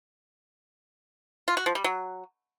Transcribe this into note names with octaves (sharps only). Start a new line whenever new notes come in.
F4
F#4
F3
G3
F#3